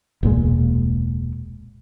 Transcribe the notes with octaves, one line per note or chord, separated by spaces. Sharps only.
E1 C#2 A#2 G#3